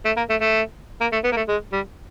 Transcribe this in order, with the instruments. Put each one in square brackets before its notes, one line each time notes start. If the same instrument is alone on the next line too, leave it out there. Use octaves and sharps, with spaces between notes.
[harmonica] A3
A#3
A3
A3
A#3
A3
B3
A#3
A3
G#3
G3